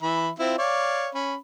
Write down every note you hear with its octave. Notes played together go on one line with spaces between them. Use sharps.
E3 E5 B5
C4 E4 F4
C#5 D5 F5
C#4 B5